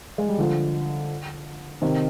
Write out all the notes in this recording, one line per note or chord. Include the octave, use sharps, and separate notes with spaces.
G#3
G3
D3 F3
C3 D#3